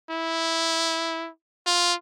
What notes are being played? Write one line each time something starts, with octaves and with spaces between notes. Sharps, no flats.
E4
F4